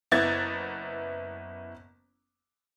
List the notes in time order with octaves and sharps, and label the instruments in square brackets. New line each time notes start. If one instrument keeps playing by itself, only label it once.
[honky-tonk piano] F#1 B3 E4 G#6 A6